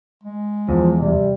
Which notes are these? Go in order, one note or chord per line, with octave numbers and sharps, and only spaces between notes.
G#3
E2 F3
C3 G3